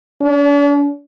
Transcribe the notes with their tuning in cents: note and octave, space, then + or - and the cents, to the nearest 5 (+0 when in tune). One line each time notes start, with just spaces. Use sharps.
D4 -45